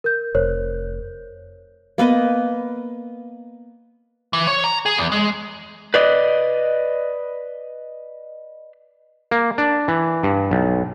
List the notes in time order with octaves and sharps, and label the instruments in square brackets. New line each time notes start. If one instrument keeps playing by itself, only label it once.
[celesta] A#4 G6
[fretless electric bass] F1 [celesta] A#4 C5 C#5
[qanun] A#3 B3 B4 D#5
[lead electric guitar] E3
C#5
A#5
G#4
E2
G#3
[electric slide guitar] B4 D5 D#5
[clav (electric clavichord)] A#3
D4
E3
G2
B1